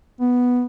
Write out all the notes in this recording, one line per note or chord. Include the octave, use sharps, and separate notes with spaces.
B3